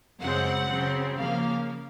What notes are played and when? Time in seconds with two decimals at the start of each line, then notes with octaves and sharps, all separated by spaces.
0.20 F#2 C#3 G#3 C4 F#5
0.69 C#3 F#3 C4
1.17 C#3 F3 A#3 F5